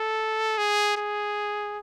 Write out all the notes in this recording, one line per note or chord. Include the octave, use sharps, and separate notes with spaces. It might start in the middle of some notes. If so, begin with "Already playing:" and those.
Already playing: A4
G#4
G#4